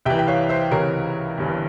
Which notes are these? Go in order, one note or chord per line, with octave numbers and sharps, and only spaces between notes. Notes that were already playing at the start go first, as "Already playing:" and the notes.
C2 C3 E3 E5 G5
G5
C#5 F5
C5 E5
C#2 C3 E3 A#4 C#5
G1 G2 E3